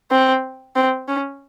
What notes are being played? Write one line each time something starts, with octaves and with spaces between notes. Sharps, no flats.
C4
C4
C#4